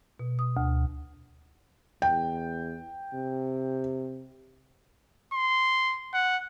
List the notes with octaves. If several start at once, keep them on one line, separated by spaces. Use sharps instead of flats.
B2
D#6
D2
E2 G5
C3
C6
F#5